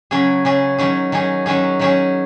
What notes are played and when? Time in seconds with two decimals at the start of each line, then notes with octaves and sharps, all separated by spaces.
0.11 C#3 F#3 C#4 G#4
0.45 C#3 F#3 C#4 G#4
0.78 D#3 F#3 C#4 G#4
1.12 D#3 F#3 C#4 G#4
1.46 D#3 F#3 C#4 G#4
1.79 D#3 F#3 C#4 G#4